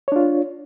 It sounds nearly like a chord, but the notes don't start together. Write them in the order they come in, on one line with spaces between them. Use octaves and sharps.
C#5 D4 F4